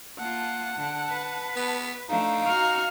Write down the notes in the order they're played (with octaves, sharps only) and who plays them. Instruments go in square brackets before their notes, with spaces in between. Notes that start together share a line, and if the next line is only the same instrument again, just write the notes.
[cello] A#3 F4 [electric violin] F#5 [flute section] A5
[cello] D3
B4
[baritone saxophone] B3
[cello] F3 D4 [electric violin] A3 [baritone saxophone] D#4 [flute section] F5 A#5
[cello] F#4 [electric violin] F6